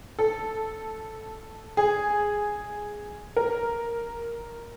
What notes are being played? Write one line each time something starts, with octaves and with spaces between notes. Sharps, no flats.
A4
G#4
A#4